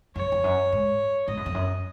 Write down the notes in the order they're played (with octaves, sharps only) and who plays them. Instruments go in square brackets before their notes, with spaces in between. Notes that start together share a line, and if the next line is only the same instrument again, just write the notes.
[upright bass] F#2 [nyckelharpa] C#5
[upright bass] F2
F#2
G#2
[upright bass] G#2 [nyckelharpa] D#5
[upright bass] F#2
F2
F#2